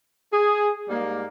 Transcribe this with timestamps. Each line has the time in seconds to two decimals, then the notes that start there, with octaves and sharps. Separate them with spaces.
0.33 G#4
0.88 G#2 G3 A#3